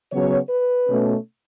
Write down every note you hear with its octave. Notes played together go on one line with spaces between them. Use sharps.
C#3 F#3 B3 C#5
B4
B2 A3 C#4